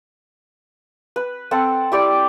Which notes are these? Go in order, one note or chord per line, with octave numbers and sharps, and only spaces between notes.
B4
C4 A4 F#5
E4 G4 D5